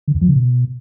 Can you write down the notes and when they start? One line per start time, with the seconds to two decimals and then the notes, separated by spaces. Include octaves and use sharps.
0.08 D3
0.15 E2
0.21 F3
0.28 C#3
0.35 B2